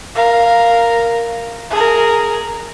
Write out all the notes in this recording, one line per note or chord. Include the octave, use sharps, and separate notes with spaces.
A#4 F5
G#4 A#4